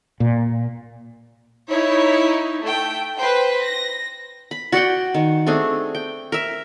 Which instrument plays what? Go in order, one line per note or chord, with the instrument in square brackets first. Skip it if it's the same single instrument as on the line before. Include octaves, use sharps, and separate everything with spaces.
[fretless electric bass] A#2
[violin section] D#4 E4 C#5
A3 G5
B4 C5 G5
A#6
[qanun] B5
F#4 D5 F#5 G5
D#3
A3 C4 D4 G#4
G5
A#4 E5